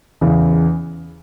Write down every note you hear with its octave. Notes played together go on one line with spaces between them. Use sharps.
E2 C#3 E3